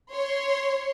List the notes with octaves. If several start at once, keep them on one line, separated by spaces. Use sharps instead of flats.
C#5 C6